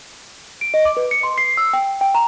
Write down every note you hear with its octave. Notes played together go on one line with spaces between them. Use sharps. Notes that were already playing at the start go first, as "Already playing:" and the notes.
D7
D#5
D6
B4
C#7
C6
C7
E6
G5
G5
A#5